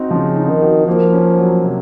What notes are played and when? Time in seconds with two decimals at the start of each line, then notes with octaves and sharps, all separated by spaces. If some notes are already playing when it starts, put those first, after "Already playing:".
Already playing: C4 D#4 F#4
0.10 C#3 F3
0.36 D#4
0.48 D#3
0.62 F#4
0.87 F3 A#3
1.13 C#4
1.38 F#3
1.63 C3